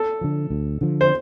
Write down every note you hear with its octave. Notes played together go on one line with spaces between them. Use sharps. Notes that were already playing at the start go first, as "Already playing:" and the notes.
Already playing: A4
D3 F3
D2
D3 F3
C5